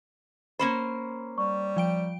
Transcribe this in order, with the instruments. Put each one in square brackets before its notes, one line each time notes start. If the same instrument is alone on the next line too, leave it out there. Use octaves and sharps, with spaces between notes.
[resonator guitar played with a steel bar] A#3 C#4 C5 [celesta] B5
[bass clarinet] G3 [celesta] C#6
[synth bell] F3 G5 D7